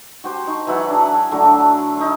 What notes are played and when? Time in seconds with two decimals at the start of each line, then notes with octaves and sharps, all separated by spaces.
0.24 F#4 G4 C5
0.47 D#4 C#6
0.67 E3 F#3 E4 F#5
0.88 D4 G#4
1.31 D3 F#3 A3 D4
1.97 D#4 E4 C#6